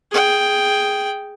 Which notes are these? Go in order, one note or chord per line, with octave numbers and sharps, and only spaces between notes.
G#4 G5